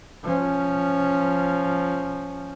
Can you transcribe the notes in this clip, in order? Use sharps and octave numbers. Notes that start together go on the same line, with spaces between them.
F3 C#4